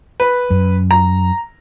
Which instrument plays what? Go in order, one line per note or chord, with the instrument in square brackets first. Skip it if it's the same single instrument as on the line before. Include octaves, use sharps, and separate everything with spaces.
[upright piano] B4
[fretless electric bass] F#2
[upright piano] A#5